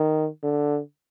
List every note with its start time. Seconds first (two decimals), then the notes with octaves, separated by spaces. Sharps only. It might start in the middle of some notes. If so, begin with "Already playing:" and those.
Already playing: D#3
0.43 D3